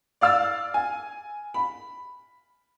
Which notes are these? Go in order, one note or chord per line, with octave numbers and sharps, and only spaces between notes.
D5 F5 E6 F6 A6
G#5
B5